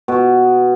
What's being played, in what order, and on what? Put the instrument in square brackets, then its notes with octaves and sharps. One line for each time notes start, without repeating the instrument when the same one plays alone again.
[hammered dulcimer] B2